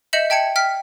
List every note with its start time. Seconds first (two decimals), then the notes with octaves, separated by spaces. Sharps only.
0.13 D#5 E5 G6 C#7 E7 F#7
0.30 E5 G5 A5 G#6 C#7
0.56 G5 F6 B6